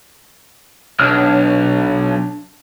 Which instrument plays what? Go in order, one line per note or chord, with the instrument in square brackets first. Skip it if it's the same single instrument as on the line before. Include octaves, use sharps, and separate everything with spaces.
[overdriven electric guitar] B1 [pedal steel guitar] D4 C#5 F6